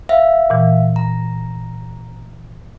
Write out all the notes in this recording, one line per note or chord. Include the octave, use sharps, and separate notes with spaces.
E5 F5
A#2 E3
A#5